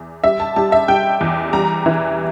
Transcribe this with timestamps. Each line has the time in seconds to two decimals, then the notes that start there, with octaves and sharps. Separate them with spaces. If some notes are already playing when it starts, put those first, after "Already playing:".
Already playing: E2
0.24 G3 E5
0.40 A5
0.56 G3 A5
0.72 E5
0.88 G3 G5
1.21 E2
1.53 G3 A#5
1.86 E3